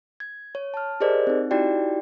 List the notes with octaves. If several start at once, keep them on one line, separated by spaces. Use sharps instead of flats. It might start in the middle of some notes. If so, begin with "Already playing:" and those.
G#6
C#5
A5 F6
G4 G#4 A#4 C5 D5 D#5
C4 D#4
D#4 E4 F#4 G4 D5 G5